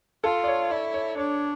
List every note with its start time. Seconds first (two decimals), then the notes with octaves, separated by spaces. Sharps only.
0.24 F4 A4
0.44 D5
0.48 C#5
0.70 E4 D5
0.94 C#5
1.17 D4 C#5